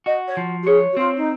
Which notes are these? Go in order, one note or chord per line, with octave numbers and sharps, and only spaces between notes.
F#4 D#5
C#5
F3
F#4
G#4 C#5
F#4
C4 F4
D#4